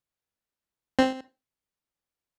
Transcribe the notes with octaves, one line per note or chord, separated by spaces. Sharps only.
C4